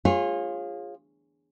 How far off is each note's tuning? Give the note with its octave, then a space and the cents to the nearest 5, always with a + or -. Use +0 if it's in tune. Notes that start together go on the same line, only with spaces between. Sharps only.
F4 +5 G#4 -20 C#5 -30